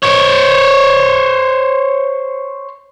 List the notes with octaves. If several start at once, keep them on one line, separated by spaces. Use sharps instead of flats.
C5 C#5